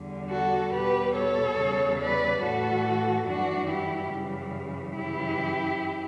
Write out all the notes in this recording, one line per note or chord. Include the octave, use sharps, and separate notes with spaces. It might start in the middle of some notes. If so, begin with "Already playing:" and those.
Already playing: E2 D3 G3
F#4 A4
E2 B2 G3 G4 B4
A4 C#5
E2 C#3 G3
B4 D5
A2 E3 A3 F#4 A4
F#2 E3 G3 D4 F#4
E4 G4
F#2 C#3 E3 G3
F#2 C#3 E3 E4 G4